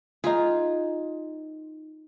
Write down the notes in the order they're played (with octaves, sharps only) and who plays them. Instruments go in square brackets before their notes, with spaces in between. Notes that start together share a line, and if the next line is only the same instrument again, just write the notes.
[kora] D#4 G#4 [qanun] F4